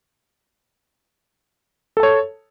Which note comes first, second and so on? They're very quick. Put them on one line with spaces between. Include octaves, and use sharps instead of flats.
A4 A5 C#5